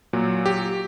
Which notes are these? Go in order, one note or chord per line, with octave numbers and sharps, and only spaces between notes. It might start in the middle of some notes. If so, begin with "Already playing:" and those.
A#2 F#3
G4